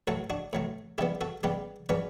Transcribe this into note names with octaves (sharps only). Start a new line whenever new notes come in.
A2 F#3 A3 F#4 A4
D4 F#4
A2 F#3 A3
C#3 G3 B3 E4 G4
F#4 A4
C#3 G3 B3 G4 B4
C#3 F#3 C#4 B4 D5